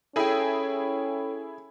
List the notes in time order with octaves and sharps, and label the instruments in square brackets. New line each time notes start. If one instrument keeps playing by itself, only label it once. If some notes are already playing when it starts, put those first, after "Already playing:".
[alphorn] C#4 [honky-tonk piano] E4 G#4 [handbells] A4 G5